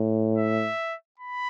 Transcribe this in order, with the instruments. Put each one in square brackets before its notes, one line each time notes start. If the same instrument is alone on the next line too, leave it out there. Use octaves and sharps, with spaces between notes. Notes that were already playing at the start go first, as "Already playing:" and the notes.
Already playing: [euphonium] A2
[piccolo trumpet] E5
B5